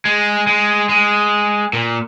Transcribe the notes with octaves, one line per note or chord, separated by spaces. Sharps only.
G#3
G#3
G#3
A#2